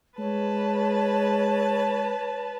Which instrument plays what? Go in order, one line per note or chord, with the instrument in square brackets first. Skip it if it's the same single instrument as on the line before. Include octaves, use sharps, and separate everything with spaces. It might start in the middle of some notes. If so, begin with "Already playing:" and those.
[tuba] G#3 [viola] B4 A5 [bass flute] C#5